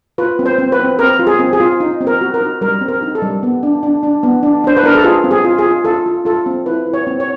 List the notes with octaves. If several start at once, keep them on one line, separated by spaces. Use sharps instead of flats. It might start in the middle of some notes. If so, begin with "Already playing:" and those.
F4 B4
C4
C5
C4
B4
C4
C4 A#4
F4
G#4
C4
G#4
F4
D#4
C4
A#4
F#4
A#4
D#4
G3 A#4
C4
A#4
D#4
A4
G3
B3
D4
D4
D4
B3
D4
D4 C5
B4
D4 A#4
A4
F4 G#4
C4
G#4
F4
G#4
F4
F4 A4
F4
F4 A4
C4
E4 B4
E4
C#5
C4
C#5